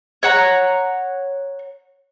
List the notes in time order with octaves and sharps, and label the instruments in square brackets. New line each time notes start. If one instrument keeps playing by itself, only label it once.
[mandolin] C#5 F#5 A#5